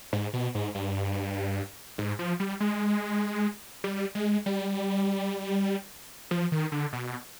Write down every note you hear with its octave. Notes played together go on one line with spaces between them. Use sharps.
G#2
B2
G#2
G2
G#2
F3
G3
G#3
G3
G#3
G3
F3
D#3
D3
B2